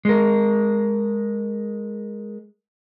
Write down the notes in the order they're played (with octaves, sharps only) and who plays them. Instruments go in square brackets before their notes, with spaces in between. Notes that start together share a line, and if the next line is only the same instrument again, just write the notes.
[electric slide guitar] G#3 A#4